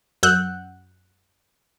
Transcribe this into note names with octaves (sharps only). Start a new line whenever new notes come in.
F#2 F#5 E6 F#6 G6